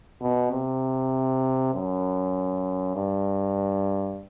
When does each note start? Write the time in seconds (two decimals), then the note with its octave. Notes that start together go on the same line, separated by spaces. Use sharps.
0.22 B2
0.51 C3
1.74 F#2
2.96 G2